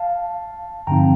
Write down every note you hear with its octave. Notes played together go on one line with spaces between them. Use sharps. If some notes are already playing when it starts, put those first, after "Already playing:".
Already playing: F5 A5
G2 D3 F3 C4 D#4 G5 A#5